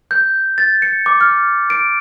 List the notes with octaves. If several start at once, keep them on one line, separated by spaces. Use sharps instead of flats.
G6
A6
C#7
D6
F6
D7